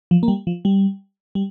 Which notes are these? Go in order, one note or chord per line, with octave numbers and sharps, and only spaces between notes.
F3
A#3
G3
F3
G3
G3